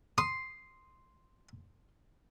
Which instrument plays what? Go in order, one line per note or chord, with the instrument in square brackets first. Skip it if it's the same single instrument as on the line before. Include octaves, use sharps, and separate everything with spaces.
[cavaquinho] C6 [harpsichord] D#6